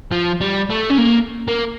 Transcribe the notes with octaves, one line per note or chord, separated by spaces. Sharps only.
F3
G3
A3
C#4
A#3
A#3